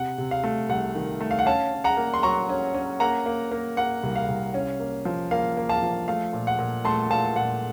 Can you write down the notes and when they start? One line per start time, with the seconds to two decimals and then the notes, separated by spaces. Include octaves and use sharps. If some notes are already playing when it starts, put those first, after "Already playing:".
Already playing: C3 F#5
0.18 C3
0.31 F5
0.44 A3
0.69 C2 F#5
0.96 D#3
1.21 A3
1.31 F5
1.39 F#5
1.46 C#4 F5 A5
1.72 C#4
1.84 F#5 A#5
1.97 A#3
2.14 C6
2.23 F#3 A#5 C#6
2.49 C#4
2.75 C#4
3.00 A#3 F#5 A#5
3.26 A#3
3.52 A#3
3.77 A#3 F#5
4.03 C2
4.16 F5
4.28 C2
4.54 C#4
4.80 A#3
5.05 F3
5.31 A#3 F5
5.57 A#3
5.69 F5 A5
5.83 F3
6.08 A3 F5
6.33 A#2
6.47 F#5
6.59 A#2
6.85 A3 A5 C6
7.10 A#2 F5 A5
7.36 A#2 F#5